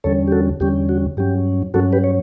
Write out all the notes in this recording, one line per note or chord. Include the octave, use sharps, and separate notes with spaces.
E2 D3 G3 C#4 A4 C#5
G4
F#4 A4
E2 D3 G3 C#4 G4
F#4
G2 F#3 C#4 G4
G2 F#3 C#4 F#4 A4
G4 B4
C#5